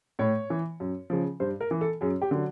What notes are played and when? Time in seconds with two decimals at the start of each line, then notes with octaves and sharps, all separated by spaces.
0.19 A2 C#5
0.50 E3
0.80 F#2
1.10 C#3 F3
1.40 G2 C5
1.61 A#4
1.71 E3
1.81 A4
2.01 F#2 G#4
2.22 G4
2.31 D3 F#3